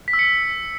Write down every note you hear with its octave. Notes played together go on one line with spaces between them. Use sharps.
B6
E6
C#7